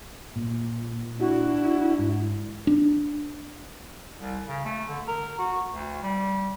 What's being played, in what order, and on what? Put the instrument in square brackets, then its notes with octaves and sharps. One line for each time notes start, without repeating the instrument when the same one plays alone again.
[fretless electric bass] A#2
[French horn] D4 [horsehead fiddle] E4 [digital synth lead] F#4
[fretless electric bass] G#2
D4
[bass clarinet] C2
C#3
A3
D3
A#4
F#4
D2
G3